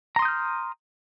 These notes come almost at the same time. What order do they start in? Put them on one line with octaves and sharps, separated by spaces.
A#5 C6 D#6 G6 F6